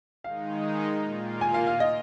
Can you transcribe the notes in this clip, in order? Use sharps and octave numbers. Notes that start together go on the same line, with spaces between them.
D#3 G#3 D#4 F5
A#2 A#3 F4
G#5
F5
F5
D#5